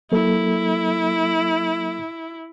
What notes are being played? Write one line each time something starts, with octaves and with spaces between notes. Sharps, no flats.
F#3 A#3 E4 A4